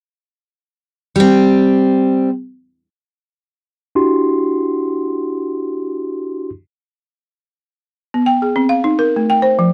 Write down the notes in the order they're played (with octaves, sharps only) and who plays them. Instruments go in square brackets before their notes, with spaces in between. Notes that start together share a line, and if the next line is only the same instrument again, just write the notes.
[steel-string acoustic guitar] G3 C4
[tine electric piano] D4 E4 F#4 G4 C6
[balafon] B3
G5
G#4
C4
F5
D#4
A#4
A3
G5
C5
F3